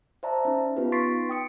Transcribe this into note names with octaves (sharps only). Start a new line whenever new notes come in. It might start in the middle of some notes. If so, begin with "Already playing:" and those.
C5 D5 E5 A5 A#5
C#4 D#4
B3 D#4 F4 G4 B4
C6 C#6 A6 B6 C7 D7
G5 D#6 C#7 D7